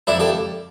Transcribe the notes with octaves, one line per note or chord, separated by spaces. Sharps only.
F2 D4 E4
G4 A4